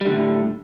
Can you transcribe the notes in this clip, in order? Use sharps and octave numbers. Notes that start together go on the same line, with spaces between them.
A2 D3 G3